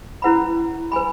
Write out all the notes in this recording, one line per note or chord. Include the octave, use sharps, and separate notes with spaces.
C#4 E4 B4 F#5 B5
B4 G#5 B5